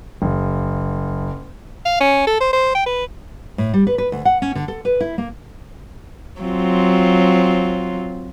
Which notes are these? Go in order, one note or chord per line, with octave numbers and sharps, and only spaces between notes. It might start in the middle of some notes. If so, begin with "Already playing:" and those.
F#1
F5
C#4
A4
C5
C5
G5
B4
A2
G3
B4
B4
D2
F#5
C#4
D3
A4
B4
E4
A#3
F#3 C4 F4